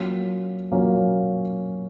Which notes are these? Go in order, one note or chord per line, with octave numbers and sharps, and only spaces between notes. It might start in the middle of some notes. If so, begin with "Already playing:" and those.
Already playing: F#3 A#3 C#4 F4
F#3 A#3 C#4 F4